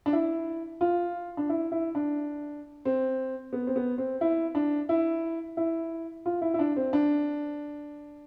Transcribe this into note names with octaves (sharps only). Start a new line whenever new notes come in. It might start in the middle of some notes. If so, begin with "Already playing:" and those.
D4
E4
F4
D4
E4
E4
D4
C4
B3
C4
B3
C4
E4
D4
E4
E4
F4
E4
E4
D4
C4
D4